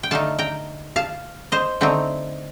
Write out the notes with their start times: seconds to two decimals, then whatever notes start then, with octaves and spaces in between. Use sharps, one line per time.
0.03 G5
0.11 D3 A3 D#4 F5 A5
0.39 G5 A#5
0.96 F5 A5
1.52 C5 D#5
1.81 D3 A3 C4 D#4